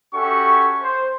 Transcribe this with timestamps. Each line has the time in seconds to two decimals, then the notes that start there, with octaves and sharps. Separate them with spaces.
0.14 C#4 F#4 G4 A4 E5 C#6
0.82 C5